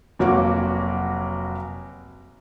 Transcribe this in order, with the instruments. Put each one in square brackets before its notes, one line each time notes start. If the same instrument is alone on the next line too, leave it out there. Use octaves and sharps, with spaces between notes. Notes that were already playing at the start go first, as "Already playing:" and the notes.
[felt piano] F1 F#3 A#3 F#4 C#5 D6